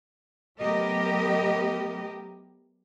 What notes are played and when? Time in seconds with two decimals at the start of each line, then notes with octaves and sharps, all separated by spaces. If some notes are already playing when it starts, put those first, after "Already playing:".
0.61 F#3 A3 B3 G4 A#4 D#5